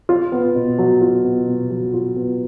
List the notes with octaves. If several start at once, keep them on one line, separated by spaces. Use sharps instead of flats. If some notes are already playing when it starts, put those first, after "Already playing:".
F4
B3
B2
F#3
F4
B3
B2
F#3
F4
B3